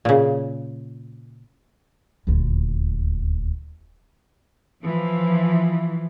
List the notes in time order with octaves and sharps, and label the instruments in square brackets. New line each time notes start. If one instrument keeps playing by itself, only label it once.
[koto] A#2 C#3
[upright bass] D#1 D2
[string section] E3 F3